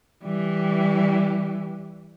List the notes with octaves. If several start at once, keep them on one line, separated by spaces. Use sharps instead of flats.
E3 G3